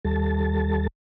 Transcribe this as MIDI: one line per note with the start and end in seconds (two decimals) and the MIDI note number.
0.05 0.87 39
0.05 0.87 55
0.05 0.87 69
0.05 0.87 81